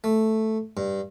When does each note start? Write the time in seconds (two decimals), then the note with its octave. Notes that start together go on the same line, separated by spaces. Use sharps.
0.04 A3
0.77 G2